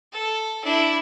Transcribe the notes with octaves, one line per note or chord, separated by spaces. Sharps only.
A4
D4 E4